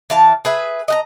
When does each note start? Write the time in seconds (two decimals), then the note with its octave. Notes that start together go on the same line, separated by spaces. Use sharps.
0.10 E3 F5 A5
0.45 G#4 B4 E5
0.88 D#5 F#5 A#5